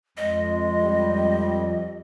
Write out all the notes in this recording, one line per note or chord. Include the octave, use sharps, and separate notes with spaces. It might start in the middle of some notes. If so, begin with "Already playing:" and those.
F2 G#3 D#5
G3